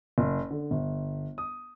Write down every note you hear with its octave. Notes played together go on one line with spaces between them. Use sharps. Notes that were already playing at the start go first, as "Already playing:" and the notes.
F#1
D3
G1
D#6